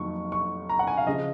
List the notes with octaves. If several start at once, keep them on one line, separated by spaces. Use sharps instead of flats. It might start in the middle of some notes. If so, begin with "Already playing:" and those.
Already playing: F2 D#3 F#3 A#3 C#6
C#6
A#5
F#5
G#5
F5
C#3 F3 D#5